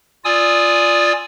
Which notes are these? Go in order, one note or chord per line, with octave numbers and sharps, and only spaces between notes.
F4 D5 G#5 D#6 E6